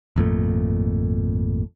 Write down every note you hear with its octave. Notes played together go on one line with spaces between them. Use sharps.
G#1 F2 A#2 A3